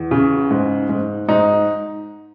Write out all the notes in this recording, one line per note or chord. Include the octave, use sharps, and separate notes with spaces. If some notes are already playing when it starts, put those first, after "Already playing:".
Already playing: E2
C#3
G#2
G#2
G#2 D#4